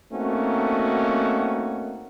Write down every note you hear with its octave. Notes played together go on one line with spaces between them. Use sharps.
A3 A#3 C4 C#4 D#4 F#4